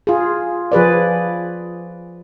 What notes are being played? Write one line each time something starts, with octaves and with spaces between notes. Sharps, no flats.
F4 G#4
F3 G#4 B4 D5